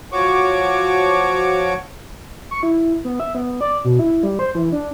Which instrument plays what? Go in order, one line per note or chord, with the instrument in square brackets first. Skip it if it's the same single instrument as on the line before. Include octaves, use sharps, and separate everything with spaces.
[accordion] F3 F#4 C#5 C#6 D6
[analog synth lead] C#6
E4
B3
E5
B3
D5
B2
E4
G3
C5
E3
D4